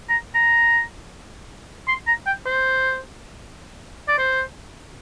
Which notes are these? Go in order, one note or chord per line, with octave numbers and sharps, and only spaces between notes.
A#5
A#5
C6
A#5
G5
C5
D5
C5